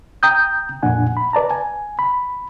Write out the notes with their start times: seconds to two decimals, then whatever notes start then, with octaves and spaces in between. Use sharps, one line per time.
0.23 G5 A#5 D#6 G6
0.83 F2 A#2 D4 F#5 G#5
1.17 B5
1.33 B4 D5 A5 A#5
1.51 G#5
1.99 B5